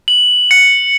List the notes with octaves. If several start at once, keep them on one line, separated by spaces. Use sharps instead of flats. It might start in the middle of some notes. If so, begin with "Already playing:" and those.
F#7
C#7